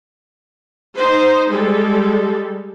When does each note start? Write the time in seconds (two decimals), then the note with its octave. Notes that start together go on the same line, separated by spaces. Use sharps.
0.98 D#4 C5
1.49 G3 G#3 A4